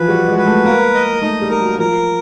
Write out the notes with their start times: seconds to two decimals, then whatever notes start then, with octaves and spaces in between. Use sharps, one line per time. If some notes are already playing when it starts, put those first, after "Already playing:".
Already playing: E3 F3 B4
0.08 G3 F#4
0.28 G#3
0.38 B4
0.46 A3
0.65 A#3 A#4
0.94 D#5
1.22 A3 D#4
1.42 G3
1.50 A#4
1.61 F#3
1.79 F3 A#4